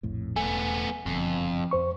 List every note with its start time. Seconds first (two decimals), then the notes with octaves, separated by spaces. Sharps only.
0.03 A#1 F2 A2
0.36 E1 A3 B3 G#5
1.06 F#1 F2 B2 D3
1.71 F2 C5 C#6